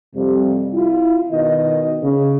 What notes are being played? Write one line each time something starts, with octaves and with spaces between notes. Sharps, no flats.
F2 C3 G3
E4 F4
B2 D#3 D#5
C#3